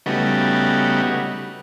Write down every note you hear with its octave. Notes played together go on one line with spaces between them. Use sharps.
C#3 G3 A3 B3 D#4 F#4